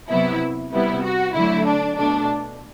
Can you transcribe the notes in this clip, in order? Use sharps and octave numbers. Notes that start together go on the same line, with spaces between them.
C3 F#3 B3 E4
C3 G3 B3 E4
F#4
D3 F#3 A3 E4
D4
B2 A3 D4